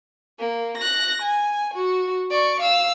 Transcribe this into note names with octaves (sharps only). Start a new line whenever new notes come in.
A#3
F#6 A#6
G#5
F#4
D5 C#6
F5 E6